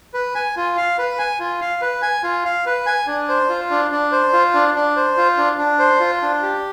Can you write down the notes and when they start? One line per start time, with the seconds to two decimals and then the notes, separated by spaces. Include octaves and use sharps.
0.14 B4
0.35 G#5
0.57 F4
0.77 F5
0.98 B4
1.19 G#5
1.40 F4
1.61 F5
1.81 B4
2.02 G#5
2.23 F4
2.44 F5
2.66 B4
2.86 G#5
3.07 D4
3.29 C5
3.49 F4
3.70 D4
3.91 D4
4.12 C5
4.33 F4
4.54 D4
4.75 D4
4.96 C5
5.17 F4
5.37 D4
5.58 D4
5.79 C5
6.00 F4
6.22 D4
6.42 G4